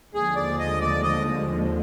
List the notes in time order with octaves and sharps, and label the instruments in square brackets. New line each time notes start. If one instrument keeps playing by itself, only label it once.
[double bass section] D#2 D3 F3 G#3 [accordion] G#4
[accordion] D5
D#5
D5
D#5